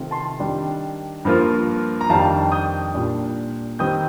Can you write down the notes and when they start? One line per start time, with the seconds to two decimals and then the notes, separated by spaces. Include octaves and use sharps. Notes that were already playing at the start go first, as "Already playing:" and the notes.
Already playing: C3 D#3 A3 C4 F4
0.11 A5 C6
0.39 D#3 G3 D4
1.25 G2 F3 A#3 F4
2.01 A#5
2.09 F2 D#3 G3 D4 F5 A5
2.52 D#6 G6
2.94 A#2 G3 D4 F4
3.79 D#3 G3 C4 D#6 G6